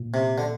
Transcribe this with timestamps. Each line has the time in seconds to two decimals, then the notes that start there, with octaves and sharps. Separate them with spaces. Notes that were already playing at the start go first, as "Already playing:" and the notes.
Already playing: A#2
0.14 C3
0.38 D3